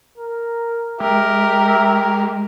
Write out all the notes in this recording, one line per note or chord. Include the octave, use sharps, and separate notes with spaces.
A#4
G#3 G4 A#4 E5